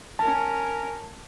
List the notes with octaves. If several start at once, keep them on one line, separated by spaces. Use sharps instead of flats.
C#4 A#4 A5